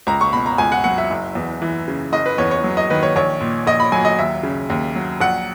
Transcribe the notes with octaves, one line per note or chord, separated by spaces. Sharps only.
C#2 A#5
C#6
B2 B5
A#5
C#2 G#5
F#5
F#3 F#5
E5
F#1
E2
E3
C#3
F#1 D#5
B4
E2 C#5
C#5
F#3
D#5
D#3 B4
C#5
A#1 C#5
A#2
A#1 D#5
B5
F#3 G#5
D#5
D#2 E5
C#3
D#2
F#3
A#1 F#5